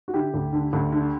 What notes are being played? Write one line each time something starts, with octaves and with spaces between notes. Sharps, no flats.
F#4
D3 E4 G4
D2
D3
D2
D3